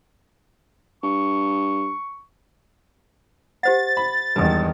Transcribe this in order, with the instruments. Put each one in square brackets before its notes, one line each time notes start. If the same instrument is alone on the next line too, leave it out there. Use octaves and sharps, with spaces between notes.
[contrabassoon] G2 [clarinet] C#6
[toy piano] G4 C5 F#5 [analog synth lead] A6
[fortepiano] B5
[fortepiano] G#1 G2 [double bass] E2 D#3